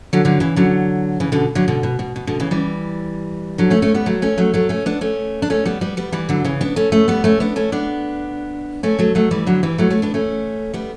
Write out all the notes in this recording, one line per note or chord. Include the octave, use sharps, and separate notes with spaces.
D3 F#3
D3 F#3
C#3 E3
D3 F#3
C#3 E3
B2 D3
D3 F#3
B2 D3
B2
B2
B2
B2 D3
C#3 E3
E3 G3
D3 F#3
A3 C#4
A3 C#4
G3 B3
F#3 A3
A3 C#4
F#3 A3
F#3 A3
A3 C#4
B3 D4
A3 C#4
D4
A3 C#4
G3 B3
G3 B3
G3 B3
E3 G3
D3 F#3
C#3 E3
B3 D4
A3 C#4
A3 C#4
G3 B3
A3 C#4
B3 D4
A3 C#4
B3 D4
A3 C#4
F#3 A3
F#3 A3
E3 G3
D3 F#3
E3 G3
F#3 A3
A3 C#4
B3 D4
A3 C#4
G3 B3